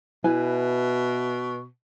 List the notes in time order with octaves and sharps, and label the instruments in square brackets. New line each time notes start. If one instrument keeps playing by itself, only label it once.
[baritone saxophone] B2 [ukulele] E4 B4 G#5